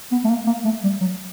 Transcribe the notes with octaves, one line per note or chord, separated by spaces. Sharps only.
B3
A3
A#3
A#3
A3
G3
F#3